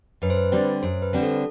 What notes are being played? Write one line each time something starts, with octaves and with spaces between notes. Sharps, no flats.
F#2 B4
C5
B4
D3 G3 C4
F#2 C5
B4
D3 G3 C4
A4